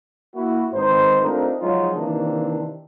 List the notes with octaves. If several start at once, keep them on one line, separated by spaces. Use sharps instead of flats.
A#3 E4 F#4
G#2 D#3 C4 D#4 B4 C5
A3 C4 D4 D#4 F4 A#4
F3 F#3 G#3 C#4 D#4 F4
C3 D#3 E3 A#3 C4 D4